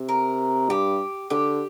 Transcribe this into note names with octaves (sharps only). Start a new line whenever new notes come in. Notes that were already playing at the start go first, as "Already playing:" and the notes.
Already playing: C3
A#4
G2 G4
D3 G4